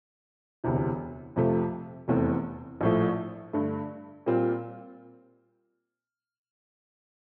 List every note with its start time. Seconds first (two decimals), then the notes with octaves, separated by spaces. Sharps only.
0.64 E1 D2 C3 E3
1.36 F2 C3 F3 A3
2.08 F1 E2 E3 A3 C4
2.81 A#1 A2 F3 A3
3.53 G2 D3 A3
4.26 A#2 G3 C4 F4